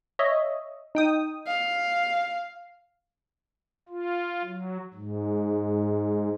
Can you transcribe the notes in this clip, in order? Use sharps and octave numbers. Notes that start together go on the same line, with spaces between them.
C#5 D#5 E5
D#4 G5 D#6
F5
F4
F#3
G#2